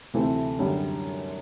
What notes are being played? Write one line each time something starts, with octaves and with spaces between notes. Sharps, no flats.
D2 C3 E3 A3 C4
F#2 D3 G3